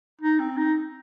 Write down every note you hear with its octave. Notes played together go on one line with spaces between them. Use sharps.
D#4
C4
D#4